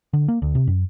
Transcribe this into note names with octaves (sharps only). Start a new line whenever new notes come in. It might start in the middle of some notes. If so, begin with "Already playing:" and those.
D3
A#3
D2
C3
F#2